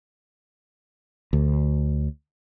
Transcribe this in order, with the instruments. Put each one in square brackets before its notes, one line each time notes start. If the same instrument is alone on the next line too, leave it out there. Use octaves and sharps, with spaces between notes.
[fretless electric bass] D2